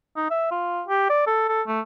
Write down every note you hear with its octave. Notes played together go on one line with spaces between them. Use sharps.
D#4
E5
F4
G4
D5
A4
A4
A3